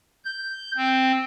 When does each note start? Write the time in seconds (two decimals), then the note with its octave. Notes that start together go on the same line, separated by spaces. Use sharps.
0.25 G6
0.77 C4